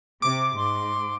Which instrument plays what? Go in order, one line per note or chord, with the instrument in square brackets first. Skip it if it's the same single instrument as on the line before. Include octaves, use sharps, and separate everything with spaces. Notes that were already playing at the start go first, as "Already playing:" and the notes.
[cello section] C3 [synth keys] D6
[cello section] G#2 [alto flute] C6